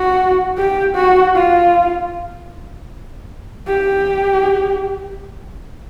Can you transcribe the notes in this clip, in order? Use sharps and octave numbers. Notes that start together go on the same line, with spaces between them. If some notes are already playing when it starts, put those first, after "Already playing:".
Already playing: F#4
G4
F#4
F4
G4